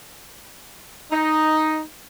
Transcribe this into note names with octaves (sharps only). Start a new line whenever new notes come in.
D#4